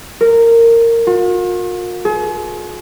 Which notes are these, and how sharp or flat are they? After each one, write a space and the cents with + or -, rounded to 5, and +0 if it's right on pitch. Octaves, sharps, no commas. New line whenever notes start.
A#4 -15
F4 +45
G#4 +40